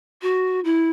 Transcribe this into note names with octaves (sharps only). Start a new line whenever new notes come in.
F#4
E4